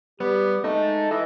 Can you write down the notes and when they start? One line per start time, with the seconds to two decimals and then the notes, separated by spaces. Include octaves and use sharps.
0.20 G3 B3 G4
0.64 G#3 A3 C4 D#4
0.82 A5
1.11 E3 D#5 E6